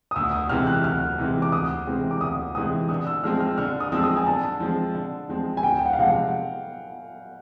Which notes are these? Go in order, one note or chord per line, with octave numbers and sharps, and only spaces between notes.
D#6
D2 E6
D#6
C3 E3 G#3 C4 F6
F#6
D2 F6
C3 E3 G#3 C4
D6
D2 D#6
C3 E3 G#3 C4
D6
D2 D#6
C3 E3 G#3 C4 D#6
D3 D#6
E6
F3 G#3 C4 F6
F6
D3 F6
D#6
F3 G#3 C4 E6
D#6
G#5
D3 A5
F3 G#3 C4
D3
F3 G#3 C4
G#5
D2 G5
F#5
F5
C3 F3 G#3 F#5
F#5